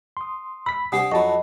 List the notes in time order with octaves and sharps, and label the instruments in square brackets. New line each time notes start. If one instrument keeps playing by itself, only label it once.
[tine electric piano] C6 D#6
[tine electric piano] B5 B6 [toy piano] E6
[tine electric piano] C3 [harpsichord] G3 G4 C5 [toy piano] D4 F#5 D#6
[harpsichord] F2 F#3 [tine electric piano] D#5 A5 B5 [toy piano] C#6